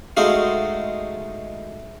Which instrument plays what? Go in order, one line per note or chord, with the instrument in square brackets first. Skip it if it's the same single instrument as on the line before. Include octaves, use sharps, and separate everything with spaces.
[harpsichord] G#3 A3 D#4 F#4 F5